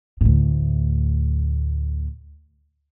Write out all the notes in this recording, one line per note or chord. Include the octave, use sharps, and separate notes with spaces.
D2 A2